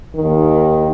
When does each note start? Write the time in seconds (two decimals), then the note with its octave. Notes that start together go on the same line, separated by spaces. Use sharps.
0.14 D#3
0.20 D#2